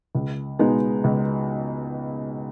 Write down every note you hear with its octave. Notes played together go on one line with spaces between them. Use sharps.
C#2
B2 G#3 B3 D#4
C#2